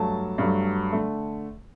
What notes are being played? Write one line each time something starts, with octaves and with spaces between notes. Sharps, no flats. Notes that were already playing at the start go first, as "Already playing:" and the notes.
Already playing: G2 F#3 A3 A5
G2 F#3 A3
D3 A3